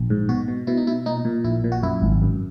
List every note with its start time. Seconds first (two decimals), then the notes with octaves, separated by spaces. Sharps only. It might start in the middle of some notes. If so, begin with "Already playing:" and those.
Already playing: A#1
0.10 G#2
0.29 B2 F#4
0.48 B2
0.67 B2 E4
0.77 D#4
0.87 B2 E4
1.06 A#2 D#4
1.25 A#2
1.44 A#1 E4
1.64 A#2
1.72 F#4
1.83 F#2 E4
2.02 G#1
2.22 F#2